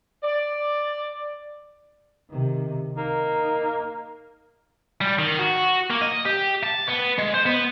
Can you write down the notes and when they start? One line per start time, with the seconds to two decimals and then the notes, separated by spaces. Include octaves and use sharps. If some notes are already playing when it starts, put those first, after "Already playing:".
0.24 D5
2.30 C3 D#3
2.97 A#3 D#4
5.01 G3
5.18 D#3
5.39 F#4
5.91 A#3
6.02 D#5
6.26 G4
6.64 A5
6.88 B3
7.18 G#3
7.34 C5
7.46 B3